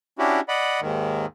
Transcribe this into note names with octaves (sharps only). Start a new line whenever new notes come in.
C#4 D4 E4 F#4 G4
D5 D#5 F#5 B5
D#2 G#2 D#3